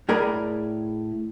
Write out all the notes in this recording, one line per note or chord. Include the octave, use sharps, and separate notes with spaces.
A2 G#4 A#4 D5 A#5 B5